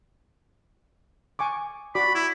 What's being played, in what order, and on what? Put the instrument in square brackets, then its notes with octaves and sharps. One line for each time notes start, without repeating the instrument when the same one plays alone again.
[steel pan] G#5 C#6 D6
[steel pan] F#4 D5 D6 [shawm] B5
[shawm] E4